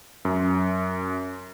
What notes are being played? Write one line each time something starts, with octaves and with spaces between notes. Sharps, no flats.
F#2